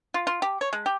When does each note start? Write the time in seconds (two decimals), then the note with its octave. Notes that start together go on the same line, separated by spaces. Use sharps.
0.14 F4
0.27 F4
0.42 G4
0.61 C#5
0.73 G#3
0.86 G4